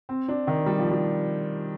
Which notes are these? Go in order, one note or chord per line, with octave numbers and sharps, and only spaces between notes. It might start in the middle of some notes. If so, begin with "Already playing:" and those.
C4
D4
D#3
G3
F3
G3